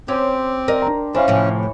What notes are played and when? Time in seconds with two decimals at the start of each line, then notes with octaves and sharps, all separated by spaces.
0.08 C4 C#4 G4 C5
0.68 A#4 D5 D#5
0.82 D4 A#5
1.15 E3 C#4 D4 C5 C#5 E5 F5
1.28 A2 C3 F3